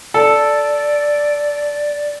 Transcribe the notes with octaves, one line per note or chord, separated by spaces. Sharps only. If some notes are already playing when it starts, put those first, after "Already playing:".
A4 D5